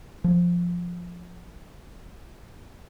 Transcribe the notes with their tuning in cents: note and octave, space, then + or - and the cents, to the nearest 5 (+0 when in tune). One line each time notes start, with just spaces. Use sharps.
F3 +5